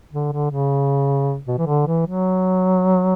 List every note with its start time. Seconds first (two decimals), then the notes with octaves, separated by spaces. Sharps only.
0.13 D3
0.32 D3
0.51 C#3
1.48 B2
1.58 E3
1.67 D3
1.87 E3
2.07 F#3